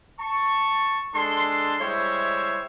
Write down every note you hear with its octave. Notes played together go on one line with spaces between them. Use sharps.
A5 C#6
G#3 D4 A4 A5 C6
G3 G#3 E4 C5 C#5 E5